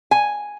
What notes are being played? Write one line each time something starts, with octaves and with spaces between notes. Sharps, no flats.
G#5